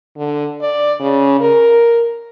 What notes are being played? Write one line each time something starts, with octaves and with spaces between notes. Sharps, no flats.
D3
D5
C#3
A#4